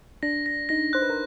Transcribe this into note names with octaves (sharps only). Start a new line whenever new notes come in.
D4 A#6
A#6
D#4 A#6
C5 F#6
B4
A#4